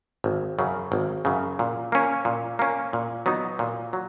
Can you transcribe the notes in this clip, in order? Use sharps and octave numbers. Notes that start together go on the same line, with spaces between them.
G#1
F#2 C#3
G#1
F#2 C#3
A#2
A#3 C#4
A#2
A#3 C#4
A#2
F#3 B3 D#4
A#2
F#3